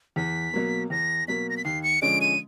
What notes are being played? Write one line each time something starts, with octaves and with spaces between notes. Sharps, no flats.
E2 B6
B2 F#3 A#3
E2 A#6
B2 F#3 A#3 B6
A#6
B6
D#2 C7
C#7
D3 F3 G#3 C#4 D7
D#7